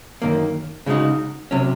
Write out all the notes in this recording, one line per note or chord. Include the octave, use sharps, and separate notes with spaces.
F#2 D#3 A#3
C#3 G#3 D#4 F#4
C3 F#3 C#4